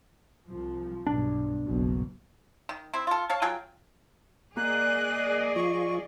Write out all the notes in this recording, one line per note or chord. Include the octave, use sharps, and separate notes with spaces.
C2 F3
B1 G2 B2 D4
F#1 B1 B2
D#3
C4 E4
F4 A4
C#5 F5 A5
F#3 F4 G#4 G5
A#3 G#4 D5 D#5 F#6
F3 F4 C#6